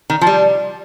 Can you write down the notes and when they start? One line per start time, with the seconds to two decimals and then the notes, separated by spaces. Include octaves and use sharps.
0.10 D#3
0.21 F3
0.27 G3